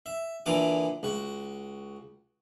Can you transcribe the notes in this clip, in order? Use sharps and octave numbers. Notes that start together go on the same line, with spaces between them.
E5
A#2 D3 E3 D6 D#6
C#2 F#4